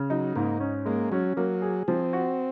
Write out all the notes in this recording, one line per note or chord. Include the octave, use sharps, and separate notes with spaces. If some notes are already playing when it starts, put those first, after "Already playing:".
Already playing: C#3
F#3 D#4
G#2 A#3
C#4
G#3 A#3
F#3 C#4
F#3 A#3
G#4
F3 C4
F#4